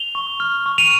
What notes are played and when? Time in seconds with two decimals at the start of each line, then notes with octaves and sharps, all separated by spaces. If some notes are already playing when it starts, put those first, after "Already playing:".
Already playing: F7 G7
0.15 C#6
0.40 F6
0.66 C#6
0.78 D#7 F7